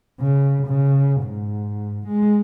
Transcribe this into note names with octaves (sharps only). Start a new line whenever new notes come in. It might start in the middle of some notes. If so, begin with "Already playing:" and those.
C#3
C#3
G#2
G#3